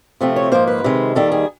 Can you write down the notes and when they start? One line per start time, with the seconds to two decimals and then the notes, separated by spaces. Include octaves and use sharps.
0.21 C3 F3 A3 C4
0.36 C#5
0.52 G#2 F3 A#3 C5
0.67 B4
0.84 C3 D#3 G#3
1.15 D#2 D#3 G3 A4
1.32 G#4